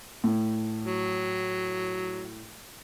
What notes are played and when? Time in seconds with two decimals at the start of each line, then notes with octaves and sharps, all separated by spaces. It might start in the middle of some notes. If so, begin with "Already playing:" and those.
0.24 A2
0.85 F#3